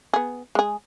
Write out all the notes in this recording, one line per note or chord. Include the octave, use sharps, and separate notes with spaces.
B3 G#4
G#3 G#4